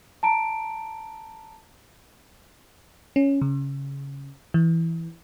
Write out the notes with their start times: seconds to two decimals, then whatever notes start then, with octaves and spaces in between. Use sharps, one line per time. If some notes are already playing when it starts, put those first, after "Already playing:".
0.23 A5 A#5 D7
3.16 C#4
3.42 C#3
4.54 E3